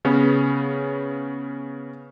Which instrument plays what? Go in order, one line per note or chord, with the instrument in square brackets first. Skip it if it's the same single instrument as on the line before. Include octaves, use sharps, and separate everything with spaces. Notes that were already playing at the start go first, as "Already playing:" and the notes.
[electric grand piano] C#3 B3 C#4